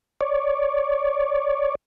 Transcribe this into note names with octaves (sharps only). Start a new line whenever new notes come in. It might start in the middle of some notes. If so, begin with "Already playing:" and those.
C#5 D5